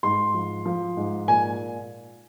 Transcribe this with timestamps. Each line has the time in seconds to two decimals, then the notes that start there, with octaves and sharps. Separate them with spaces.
0.03 G#2 C6
0.34 F3
0.65 F3
0.97 G#2
1.28 A#2 G#5